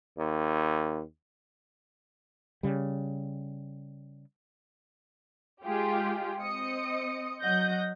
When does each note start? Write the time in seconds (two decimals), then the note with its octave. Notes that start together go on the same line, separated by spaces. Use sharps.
0.18 D#2
2.63 C#3 G3
5.64 G#3 F4 G4 G#4
6.41 C4 D#5 D#6 C#7
7.41 F#3 D#5 F#5 G6 A#6